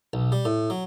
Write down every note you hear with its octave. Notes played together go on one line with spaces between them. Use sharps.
B1
G3
A2
F#3